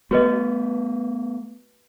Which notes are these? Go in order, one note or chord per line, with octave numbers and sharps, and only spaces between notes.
A3 B3 F#4 B4 D#5